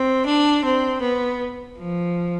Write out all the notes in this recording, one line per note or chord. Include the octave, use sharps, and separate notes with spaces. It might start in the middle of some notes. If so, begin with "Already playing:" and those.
Already playing: C4
D4
C4
B3
F3